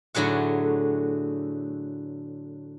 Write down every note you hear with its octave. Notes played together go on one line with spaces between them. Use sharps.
A2 D3 F#3 G#4 F#5